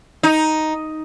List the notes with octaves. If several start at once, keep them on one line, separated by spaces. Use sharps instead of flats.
D#4